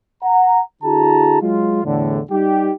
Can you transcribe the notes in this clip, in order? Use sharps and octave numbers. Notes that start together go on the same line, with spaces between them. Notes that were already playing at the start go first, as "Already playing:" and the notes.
F#5 A#5
D3 E4 F#4 G#4 A5 A#5
F#3 G#3 F4
E2 A2 D3
G3 D#4 G4